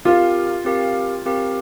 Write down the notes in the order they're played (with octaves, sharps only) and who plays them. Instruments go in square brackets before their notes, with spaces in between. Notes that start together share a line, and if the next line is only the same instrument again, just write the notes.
[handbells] C4 G4 A#4 F5 [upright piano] F4
[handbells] C4 G4 A#4 F5
C4 G4 A#4 F5